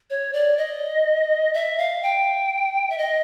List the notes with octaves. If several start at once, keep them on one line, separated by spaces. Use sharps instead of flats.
C#5
D5
D#5
E5
F5
G5
E5
D#5